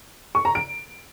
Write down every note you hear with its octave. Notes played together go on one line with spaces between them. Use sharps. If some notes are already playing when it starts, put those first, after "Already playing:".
C#6
A#5
D7